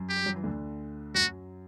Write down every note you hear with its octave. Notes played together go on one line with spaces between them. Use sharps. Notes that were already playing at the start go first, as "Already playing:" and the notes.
Already playing: F#2
G4
G3
F#3
E3
D2 D3
F#2 F#3 F#4